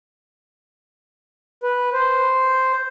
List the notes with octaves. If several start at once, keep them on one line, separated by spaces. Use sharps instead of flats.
B4
C5